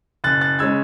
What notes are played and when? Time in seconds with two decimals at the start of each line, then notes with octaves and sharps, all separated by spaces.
0.24 F#1 F#6 A6
0.41 F#6 A6
0.59 C#3 G#3 C#4 E6 G#6